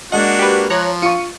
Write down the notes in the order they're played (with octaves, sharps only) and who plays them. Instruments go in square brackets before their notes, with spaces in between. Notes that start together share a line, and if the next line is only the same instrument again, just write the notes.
[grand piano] G#3 D#5 [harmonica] A#3 D4 F#4 [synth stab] F#5
[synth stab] G4 B4
[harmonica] F3 [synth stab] C#5 A#5 F#6
[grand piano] F4 C#6 [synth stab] C#7 D#7